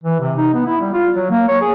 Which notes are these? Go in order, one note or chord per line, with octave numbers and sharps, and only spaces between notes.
E3
C3
D#4
B3
E4
G3
F4
F#3
A#3
C#5
G#4